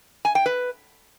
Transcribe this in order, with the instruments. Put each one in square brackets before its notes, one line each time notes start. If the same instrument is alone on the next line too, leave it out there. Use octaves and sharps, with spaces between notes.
[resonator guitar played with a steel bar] G#5
G5
B4